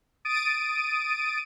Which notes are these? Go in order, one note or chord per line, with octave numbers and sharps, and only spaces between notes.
D#6 A6 D7 D#7